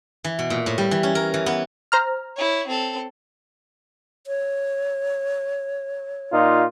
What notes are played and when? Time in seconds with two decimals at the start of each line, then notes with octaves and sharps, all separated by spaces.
0.24 E3
0.39 B2
0.50 A#2
0.66 A2
0.78 G3
0.91 E3
1.03 C#4
1.15 A#4
1.34 E3
1.46 B3
1.92 C5 A#5 F6
2.36 E4 C#5
2.67 C4 A4
4.27 C#5
6.33 A#2 D#4 F4